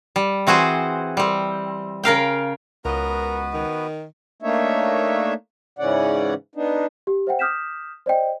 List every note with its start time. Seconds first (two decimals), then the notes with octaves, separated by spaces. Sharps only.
0.16 G3
0.47 E3 C4 F#4 G#4 C5
1.17 G3 C4
2.03 C#3 A#4 F5 G5
2.85 C#2 B3 F#4 A#4 B4 D#5
3.54 D#3
4.42 A3 A#3 D4 D#4 C#5 E5
5.79 G#2 C#3 E3 C#4 D5 F#5
6.55 B3 D4 D#4
7.07 G4
7.27 C5 E5 F#5 G5
7.39 D6 D#6 F6 G6 B6 E7
8.06 C5 D5 D#5 G5